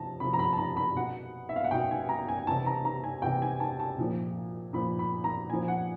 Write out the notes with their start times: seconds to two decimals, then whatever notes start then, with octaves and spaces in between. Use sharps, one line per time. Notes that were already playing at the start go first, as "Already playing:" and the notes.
Already playing: C3 F3 A5 A#5
0.20 C3 F3 B5
0.33 A#5
0.39 B5
0.53 A5
0.58 A#5
0.77 B5
0.95 B2 F#5
1.49 E5
1.56 F5
1.64 F#5
1.71 B2 G5
1.91 G#5
2.09 A#5
2.28 G#5
2.47 C3 E3 A5
2.66 A#5
2.85 A#5
3.04 G#5
3.22 C3 E3 G5
3.42 G#5
3.60 A5
3.80 A5
3.98 A#2 F3
4.73 A#2 F3 B5
4.99 B5
5.24 A#5
5.49 A#2 F3 G#5
5.68 F#5